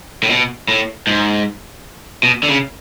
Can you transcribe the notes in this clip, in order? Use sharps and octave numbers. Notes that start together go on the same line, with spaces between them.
A2
B2
A2
G#2
B2
D3
C#3